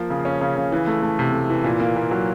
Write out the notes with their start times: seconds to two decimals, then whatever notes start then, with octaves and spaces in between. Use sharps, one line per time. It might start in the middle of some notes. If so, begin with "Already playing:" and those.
Already playing: F3 A#3
0.10 C#3
0.25 C#4
0.41 C#3
0.56 C#3
0.72 E3
0.87 A3
1.02 A3
1.19 C3
1.33 A3
1.50 E3
1.64 A#2
1.80 A#3
1.96 A#2
2.11 F#3